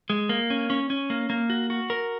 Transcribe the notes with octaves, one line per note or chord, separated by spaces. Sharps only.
G#3
A#3
C#4
C#4
C#4
A#3
A#3
F#4
F#4
A#4